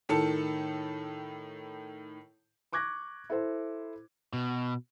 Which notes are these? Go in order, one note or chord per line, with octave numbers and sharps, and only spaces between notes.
A2 D#3 A4 A5 C#7
C#6 D6 F#6 G#6 A#6
E4 A4 C5
B2